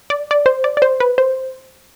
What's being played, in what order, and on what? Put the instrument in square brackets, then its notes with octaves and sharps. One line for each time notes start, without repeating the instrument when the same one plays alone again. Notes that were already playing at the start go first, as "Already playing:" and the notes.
[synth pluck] D5
D5
C5
D5
D5
C5
B4
C5